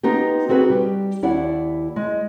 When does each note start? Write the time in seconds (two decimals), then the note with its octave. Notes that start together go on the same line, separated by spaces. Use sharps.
0.03 B3 D#4 F4 G4
0.49 C4 F#4 G#4 B4
0.70 G3 G4
1.23 D#2 E4 D5 F#5
1.96 G#3